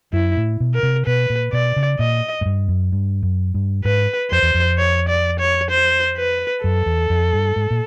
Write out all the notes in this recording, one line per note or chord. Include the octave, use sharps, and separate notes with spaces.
F#2 E4
A2
B2
A#4
C3
B2 B4
A#2
B2 D5
C#3
A#2 D#5
G#2
G2
F#2
G2
F#2
G2
G#2 B4
F2 C5
E2
F2
C#5
D5
C#5
C5
B4
F#2 A4
E2
F2
G2
G#2
A#2